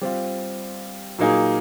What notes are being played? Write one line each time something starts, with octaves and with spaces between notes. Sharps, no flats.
G3 C4 F4
A#2 F#3 A#3 D#4 G#4